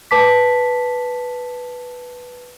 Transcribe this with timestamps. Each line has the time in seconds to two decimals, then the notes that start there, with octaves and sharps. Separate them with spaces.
0.11 B4 A5 D6 B6